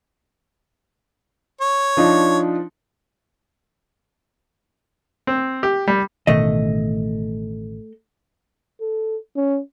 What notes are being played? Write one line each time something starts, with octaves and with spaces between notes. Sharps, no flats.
C#5
F3 D4 D#4
C4
G4
G3
A1 B2 D#3 A3 D#5
A4
C#4